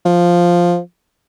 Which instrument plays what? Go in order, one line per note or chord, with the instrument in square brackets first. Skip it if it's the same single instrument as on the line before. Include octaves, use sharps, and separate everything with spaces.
[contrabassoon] F3